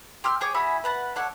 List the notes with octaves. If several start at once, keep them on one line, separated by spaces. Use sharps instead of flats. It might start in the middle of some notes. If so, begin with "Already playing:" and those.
G4 C6 E6 F6
G4 G#4 C#5 D6
E4 F#4 G#4 B5
B4 F#5 A5
D4 A4 C#5 F#5